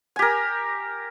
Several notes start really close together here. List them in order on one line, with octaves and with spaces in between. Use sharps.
G#5 G4 A#4